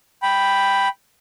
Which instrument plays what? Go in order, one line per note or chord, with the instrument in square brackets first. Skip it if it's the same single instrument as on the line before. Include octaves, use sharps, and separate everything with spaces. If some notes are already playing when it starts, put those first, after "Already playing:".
[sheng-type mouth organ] G5 B5